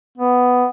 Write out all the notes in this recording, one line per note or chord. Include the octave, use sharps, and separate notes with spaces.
B3